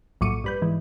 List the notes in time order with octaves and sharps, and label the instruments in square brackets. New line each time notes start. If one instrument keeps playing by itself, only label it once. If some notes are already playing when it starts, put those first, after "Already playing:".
[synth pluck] A#1 A2 F#3 D6 C#7 D#7
G2 B4 G6
G#2 E3